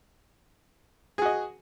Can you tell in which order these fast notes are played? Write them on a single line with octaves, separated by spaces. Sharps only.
G#4 F#4 D#5